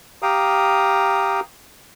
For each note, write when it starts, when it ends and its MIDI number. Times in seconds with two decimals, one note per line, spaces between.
0.22 1.40 67
0.22 1.40 77
0.22 1.40 79
0.22 1.40 82
0.22 1.40 87